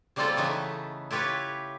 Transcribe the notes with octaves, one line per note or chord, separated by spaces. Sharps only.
C#3 G3 A#3 C4 F4 A4
C#3 E3 A3 B3 D#4
E4 F4 G4 B4 C#5